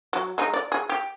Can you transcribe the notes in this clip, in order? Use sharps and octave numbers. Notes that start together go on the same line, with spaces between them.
F#3
G#3 D#4
D5
G#4
G4